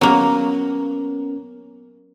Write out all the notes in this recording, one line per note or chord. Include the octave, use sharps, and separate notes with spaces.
F#3 A#3 B3 C#4 A#4